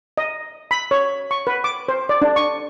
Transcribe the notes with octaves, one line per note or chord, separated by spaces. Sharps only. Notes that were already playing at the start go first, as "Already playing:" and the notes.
D#5
B5
C#5
C#6
B4
D6
C5
D5
D4
C#6